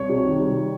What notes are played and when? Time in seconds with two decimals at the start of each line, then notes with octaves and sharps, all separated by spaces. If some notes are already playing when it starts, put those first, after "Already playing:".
Already playing: C2 C#5
0.09 C3
0.25 D#3
0.40 G3